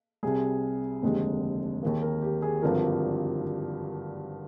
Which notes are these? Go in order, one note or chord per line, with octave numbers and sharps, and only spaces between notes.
C2 C3 G3 G#4
F1 D#2 D3 G#3 G4
D#2 D#3 A#3 G#4
A#4
G4
G#4
G#1 G2 D3 F3 A#4